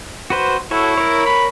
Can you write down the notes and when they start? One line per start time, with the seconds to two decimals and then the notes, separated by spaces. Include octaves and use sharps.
0.30 F#4 B4 C5
0.71 E4 F#4 A4 C#5
0.98 A#4 C#5
1.25 B5